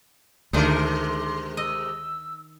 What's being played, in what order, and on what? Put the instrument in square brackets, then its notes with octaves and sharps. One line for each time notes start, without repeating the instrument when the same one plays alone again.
[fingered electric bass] D2 [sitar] C3 G#3 A#4 [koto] D#3 D4 D#4 [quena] C6
[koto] D#5 [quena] E6